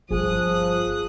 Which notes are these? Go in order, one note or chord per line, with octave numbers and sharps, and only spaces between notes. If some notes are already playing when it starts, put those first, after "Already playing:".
G1 F3 G#4 D#6 F#6